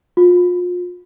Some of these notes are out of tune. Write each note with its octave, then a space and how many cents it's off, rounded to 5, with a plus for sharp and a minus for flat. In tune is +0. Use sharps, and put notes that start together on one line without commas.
F4 +35